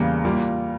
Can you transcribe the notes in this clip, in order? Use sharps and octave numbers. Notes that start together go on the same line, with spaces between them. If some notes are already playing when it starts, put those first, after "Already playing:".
Already playing: E2 C#3 G3 A#3
G3 A#3 F4